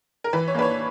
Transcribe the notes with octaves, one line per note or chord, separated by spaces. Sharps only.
A#4
E3 B4
C#5
A#3 D4 B4
C#5